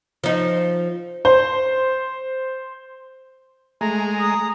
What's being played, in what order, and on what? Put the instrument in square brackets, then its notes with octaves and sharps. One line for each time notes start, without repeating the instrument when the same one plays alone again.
[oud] F3 D#4
[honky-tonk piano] C5
[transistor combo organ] G#3 [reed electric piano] A3 [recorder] A#5
[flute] D#6